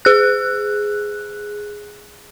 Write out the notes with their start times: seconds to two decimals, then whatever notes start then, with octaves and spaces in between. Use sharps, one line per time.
0.05 G#4 F#6